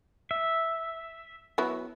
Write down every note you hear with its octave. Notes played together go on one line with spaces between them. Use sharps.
E5
F#3 B3 E4